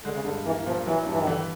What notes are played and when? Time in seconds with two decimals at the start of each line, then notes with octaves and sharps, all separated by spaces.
0.04 D3 G#3
0.15 C#3
0.24 G2 D3
0.45 E3 A#3
0.66 A#2 F3
0.86 E3 F#3
1.06 G2 E3
1.19 D#3
1.27 D3 E3